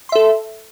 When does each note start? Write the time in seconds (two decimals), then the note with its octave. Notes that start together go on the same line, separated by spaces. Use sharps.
0.09 C6
0.12 E5
0.15 A4